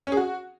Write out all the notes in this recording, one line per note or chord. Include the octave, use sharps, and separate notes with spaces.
C#4
G#4
F#4